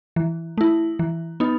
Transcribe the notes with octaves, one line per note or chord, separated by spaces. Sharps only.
E3
A3 E4
E3
B3 D#4